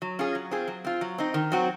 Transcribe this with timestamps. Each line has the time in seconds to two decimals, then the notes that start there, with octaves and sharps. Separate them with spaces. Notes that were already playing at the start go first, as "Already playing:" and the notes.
0.02 F#3
0.19 C#4 F4 G#4
0.35 F#3
0.51 C4 F4 G#4
0.68 F#3
0.84 C4 F4
1.01 F#3
1.18 C4 D#4
1.34 D#3
1.52 F#3 C4 F#4